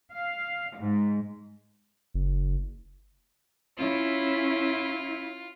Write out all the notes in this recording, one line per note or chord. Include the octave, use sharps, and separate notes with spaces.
F5
G#2
F#1
C#4 E4 F4